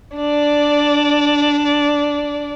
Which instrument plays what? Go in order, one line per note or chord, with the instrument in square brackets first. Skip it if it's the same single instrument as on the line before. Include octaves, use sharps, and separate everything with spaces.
[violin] D4 D5